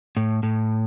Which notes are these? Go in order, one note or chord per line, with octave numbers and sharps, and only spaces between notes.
A2
A2